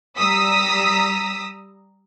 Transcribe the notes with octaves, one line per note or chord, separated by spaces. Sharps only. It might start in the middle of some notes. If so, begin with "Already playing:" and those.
G3 A#5 D#6 E6 B6